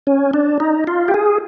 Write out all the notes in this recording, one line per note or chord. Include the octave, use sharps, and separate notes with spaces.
C#4
D4
D#4
F4
G4
G#4